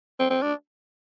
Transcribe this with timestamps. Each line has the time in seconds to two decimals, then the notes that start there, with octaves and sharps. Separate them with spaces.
0.19 C4
0.30 C4
0.42 D4